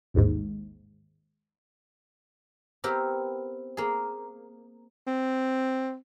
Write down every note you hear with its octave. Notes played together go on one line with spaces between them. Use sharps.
A1 D#2 G#2
B3 C4 E4 G4 A#4 B4
A#3 G#4
C4